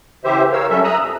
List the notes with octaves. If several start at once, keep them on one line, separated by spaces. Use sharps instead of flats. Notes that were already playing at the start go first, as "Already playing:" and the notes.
C#3 E3 G4 C5 E5
A#4 C#5 F5 E6
F#3 G3 C#4 A4 E5
E5 A#5 D#6 E6 F#6
F2 C3 F3